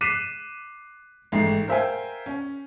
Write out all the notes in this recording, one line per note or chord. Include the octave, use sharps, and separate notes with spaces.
D6 F#6 B6 C7 D#7 E7
A1 G#2 A3 C7
A#4 C5 E5 F5 G5 G#5
C#4